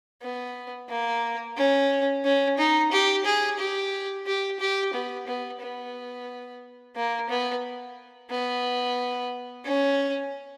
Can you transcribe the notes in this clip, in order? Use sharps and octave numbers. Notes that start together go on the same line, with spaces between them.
B3
A#3
C#4
C#4
D#4
G4
G#4
G4
G4
G4
B3
B3
B3
A#3
B3
B3
C#4